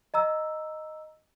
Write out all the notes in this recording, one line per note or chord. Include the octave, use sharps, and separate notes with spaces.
D#5 A#5 E6